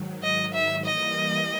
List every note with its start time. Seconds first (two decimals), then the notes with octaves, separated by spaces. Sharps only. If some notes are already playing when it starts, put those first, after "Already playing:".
Already playing: G#2 D#3 F#3
0.23 D#5
0.54 E5
0.85 E3 G3 A#3 D#5